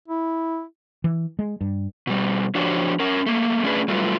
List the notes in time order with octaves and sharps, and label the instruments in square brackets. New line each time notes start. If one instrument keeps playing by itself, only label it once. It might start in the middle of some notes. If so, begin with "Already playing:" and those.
[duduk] E4
[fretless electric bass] E3
G#3
G2
[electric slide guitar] B2 G3
F3 D4 F#4 G4 C5 C#5
C#4 A#4
A3 A#3
A3 C#4 D4 G#4 B4
F#3 G3 A3 E4 F4 B4